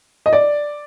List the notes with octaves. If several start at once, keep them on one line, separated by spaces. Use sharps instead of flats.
D#5
D5